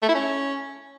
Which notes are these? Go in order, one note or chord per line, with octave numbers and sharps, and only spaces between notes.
A3
E4
C#4